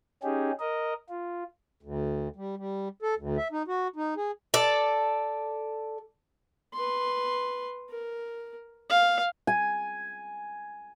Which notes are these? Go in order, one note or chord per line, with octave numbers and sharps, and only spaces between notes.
C#4 D#4 G4 G#4
A#4 D#5
F4
D2
G3
G3
A4
D2
E5
D#4
F#4
D#4
G#4
A4 D5
B4 C6
A#4
F5
G#5